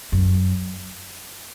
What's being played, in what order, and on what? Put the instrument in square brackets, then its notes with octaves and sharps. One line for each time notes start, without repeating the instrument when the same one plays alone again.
[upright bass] F#2